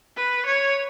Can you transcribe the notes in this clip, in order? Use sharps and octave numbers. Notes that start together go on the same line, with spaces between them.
B4
C#5